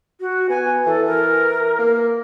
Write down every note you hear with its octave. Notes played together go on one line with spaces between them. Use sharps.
F#4
B3 G#5
E3 A4
A#4
A#3